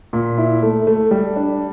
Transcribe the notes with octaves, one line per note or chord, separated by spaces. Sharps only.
A#2
E4
A3
A3
G3
D4